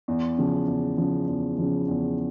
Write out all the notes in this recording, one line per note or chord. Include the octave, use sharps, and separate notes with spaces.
E2
C#3 F3
E2
C#3 F3
E2
C#3 F3
E2